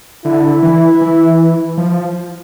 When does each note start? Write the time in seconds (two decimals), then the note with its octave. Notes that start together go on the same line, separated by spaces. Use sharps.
0.25 D3 E4
0.62 E3
1.01 E3
1.78 F3